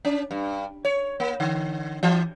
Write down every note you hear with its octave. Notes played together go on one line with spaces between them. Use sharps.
C#4
G2
C#5
A#3
D3
E3